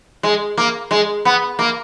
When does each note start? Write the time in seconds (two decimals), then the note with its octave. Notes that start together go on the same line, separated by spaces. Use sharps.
0.23 G#3
0.57 A#3
0.91 G#3
1.25 B3
1.59 A#3